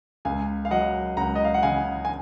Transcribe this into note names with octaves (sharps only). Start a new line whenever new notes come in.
C#2 F5 G#5
F5
F#3 D#5 F#5
C#2 F#5 A#5
D#5
F5
F#5
C#3 F5 G#5
G#5